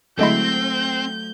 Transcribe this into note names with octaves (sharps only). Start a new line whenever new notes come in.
D3 F#3 G#3 A3 C4 E4 C5 G6